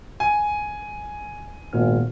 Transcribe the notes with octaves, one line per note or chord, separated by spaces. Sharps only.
G#5
G#1 A#2 B3 F6